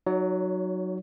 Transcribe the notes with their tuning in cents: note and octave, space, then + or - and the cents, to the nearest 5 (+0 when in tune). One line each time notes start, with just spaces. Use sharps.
F#3 +0 D#4 +0 C#5 +35